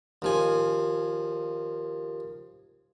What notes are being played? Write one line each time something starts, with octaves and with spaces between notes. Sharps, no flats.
D#2 F3 G#5